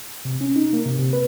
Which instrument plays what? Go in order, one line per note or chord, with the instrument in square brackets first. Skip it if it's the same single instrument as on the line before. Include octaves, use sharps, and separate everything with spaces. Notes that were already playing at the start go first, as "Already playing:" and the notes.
[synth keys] C3
C#4
D#4
A#3
C3
C3
B4